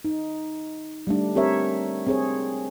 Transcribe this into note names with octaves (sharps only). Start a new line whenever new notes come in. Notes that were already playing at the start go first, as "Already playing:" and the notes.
D#4
G3 A3 D4
C4 G4 A#4 C#5 E5
C4 G#4 C#5